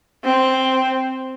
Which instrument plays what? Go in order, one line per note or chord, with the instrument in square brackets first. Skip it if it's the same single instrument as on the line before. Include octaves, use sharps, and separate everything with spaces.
[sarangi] C4